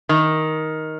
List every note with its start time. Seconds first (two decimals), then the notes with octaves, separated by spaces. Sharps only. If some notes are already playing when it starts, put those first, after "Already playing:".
0.09 D#3